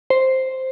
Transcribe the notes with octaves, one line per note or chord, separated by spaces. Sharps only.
C5